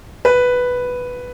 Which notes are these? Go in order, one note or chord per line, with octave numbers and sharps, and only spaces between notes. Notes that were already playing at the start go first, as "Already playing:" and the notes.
B4